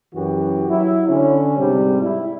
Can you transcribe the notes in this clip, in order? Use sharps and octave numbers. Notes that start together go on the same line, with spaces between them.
F#2 E3 F#4 G4
F#3 E4
D3 C#4
G#2 C3 G3
E4